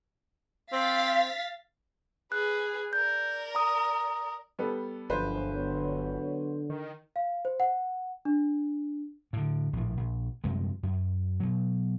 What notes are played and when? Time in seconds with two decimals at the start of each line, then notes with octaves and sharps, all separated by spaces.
0.73 C4 F5 A6 B6
2.32 G#4 B4 F#6
2.93 A#4 D5 G6
3.55 A#5 D#6
4.59 G3 B3 A4
5.10 G1 F#2 D3 F3 B4 C5
5.53 F#3 B3 C#5
6.70 D#3
7.16 F5
7.45 C5
7.60 F#5
8.25 D4
9.33 A2 D3
9.73 A#1 A2
9.97 A#1
10.44 F#2 C3 G3 G#3
10.83 F#2
11.40 B2 F#3